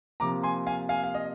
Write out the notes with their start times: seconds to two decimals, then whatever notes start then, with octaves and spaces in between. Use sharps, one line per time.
0.20 C3 F3 A#3 A#5 D6
0.43 G#5 C6
0.67 F5 G#5
0.89 F5 G#5
1.04 F5
1.14 D#5